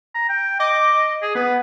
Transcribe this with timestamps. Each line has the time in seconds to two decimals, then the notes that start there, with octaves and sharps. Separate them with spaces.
0.15 A#5
0.29 G5
0.60 D#5 D6
1.22 G#4
1.35 B3 B4